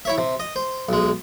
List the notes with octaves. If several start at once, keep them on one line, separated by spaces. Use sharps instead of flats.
E4 C#5 E5
C3
D#5
C5
B1 G#3